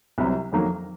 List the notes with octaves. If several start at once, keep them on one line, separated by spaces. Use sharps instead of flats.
C2 C3 F#3
F2 D#3 F#3 A#3